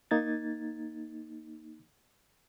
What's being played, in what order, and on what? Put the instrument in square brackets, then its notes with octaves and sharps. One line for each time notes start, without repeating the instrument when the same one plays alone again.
[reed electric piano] A#3 D#4 G#6 A6